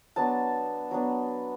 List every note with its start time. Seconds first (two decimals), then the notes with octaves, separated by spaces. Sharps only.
0.16 F#3 B3 D4 A5
0.91 F#3 B3 D4